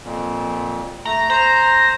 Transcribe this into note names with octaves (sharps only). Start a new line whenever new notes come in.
F2 A#2
A3 A#5
C5 A#5